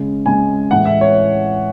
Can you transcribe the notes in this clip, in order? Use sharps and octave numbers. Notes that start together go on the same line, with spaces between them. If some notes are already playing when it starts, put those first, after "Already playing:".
Already playing: C#3 G#3
C#3 G#3 G#5
A2 E3 G#3 F#5
E5
C#5